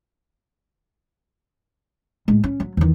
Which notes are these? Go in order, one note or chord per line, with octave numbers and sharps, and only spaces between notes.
A2 G#3
C#4
F#3
E2 D#3